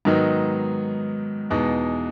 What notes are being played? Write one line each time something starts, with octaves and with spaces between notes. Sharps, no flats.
G#2 D#3 F#3 B3 D#4
E2 B2 G#3 D#4